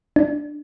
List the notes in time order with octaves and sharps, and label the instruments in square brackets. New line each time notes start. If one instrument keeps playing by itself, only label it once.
[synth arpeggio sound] D4